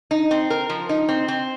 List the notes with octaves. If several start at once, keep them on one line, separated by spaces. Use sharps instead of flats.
D#4
C4
A#4
F3
D#4
C4
C4